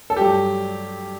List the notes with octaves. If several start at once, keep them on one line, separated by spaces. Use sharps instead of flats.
A4
G2 F#3 A3 G4